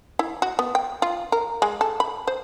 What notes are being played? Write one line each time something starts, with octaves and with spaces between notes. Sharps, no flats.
E4
F#4
B3
G5
F4
A#4
G#3
A4
B5
C5